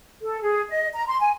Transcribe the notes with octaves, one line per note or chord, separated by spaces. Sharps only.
A4
G#4
D#5
A#5
C6
G#5